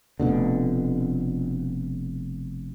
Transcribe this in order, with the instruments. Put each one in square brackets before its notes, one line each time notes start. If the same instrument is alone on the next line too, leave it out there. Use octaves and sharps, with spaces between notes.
[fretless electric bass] F1 C2 B2 D3